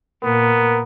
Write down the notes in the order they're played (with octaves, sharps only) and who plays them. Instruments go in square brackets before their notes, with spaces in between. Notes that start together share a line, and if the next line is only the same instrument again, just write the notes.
[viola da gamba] A#2 [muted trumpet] B3 [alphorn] A#4